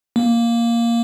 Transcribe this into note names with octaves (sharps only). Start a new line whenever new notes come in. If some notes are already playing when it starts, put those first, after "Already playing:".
A#3